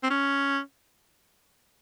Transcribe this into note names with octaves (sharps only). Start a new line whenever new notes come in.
C4
C#4